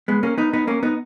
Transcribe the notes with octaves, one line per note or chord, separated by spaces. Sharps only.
G#3 B3
A#3 C#4
B3 D#4
B3 D#4
A#3 C#4
B3 D#4